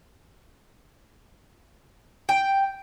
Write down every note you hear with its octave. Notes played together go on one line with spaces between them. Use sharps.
G5